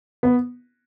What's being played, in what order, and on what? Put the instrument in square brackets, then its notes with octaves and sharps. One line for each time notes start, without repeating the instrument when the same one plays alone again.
[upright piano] B3